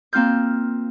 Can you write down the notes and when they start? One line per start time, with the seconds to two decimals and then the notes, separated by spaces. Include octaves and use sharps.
0.13 A#3 C4 F4 F6 G6